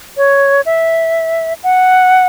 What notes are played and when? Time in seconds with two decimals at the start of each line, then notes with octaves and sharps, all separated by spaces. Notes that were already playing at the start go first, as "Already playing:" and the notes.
0.17 C#5
0.66 E5
1.64 F#5